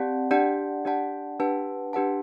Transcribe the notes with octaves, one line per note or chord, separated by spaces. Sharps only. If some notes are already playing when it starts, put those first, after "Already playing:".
Already playing: C4 G4 D5 F#5 A5
D4 G4 D5 F#5 A5
D4 G4 D5 F#5 A5
D4 G4 B4 F#5 A5
D4 G4 B4 F#5 A5